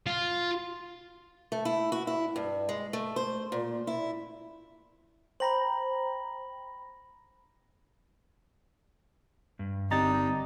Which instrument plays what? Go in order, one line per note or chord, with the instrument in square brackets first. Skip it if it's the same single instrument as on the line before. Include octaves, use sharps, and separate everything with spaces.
[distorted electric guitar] F4
[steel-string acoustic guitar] A3
E4
F#4
E4
G2
G#3
A3
C5
A#2
E4
[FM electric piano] C5 G5 A#5 [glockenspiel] B5 A#6 F#7
[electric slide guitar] G2
[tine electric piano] G1 A#5 A6 [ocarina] C4 [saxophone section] D4 D#4 G4